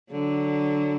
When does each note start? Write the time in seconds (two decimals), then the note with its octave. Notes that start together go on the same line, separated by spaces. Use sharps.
0.11 D3 F#3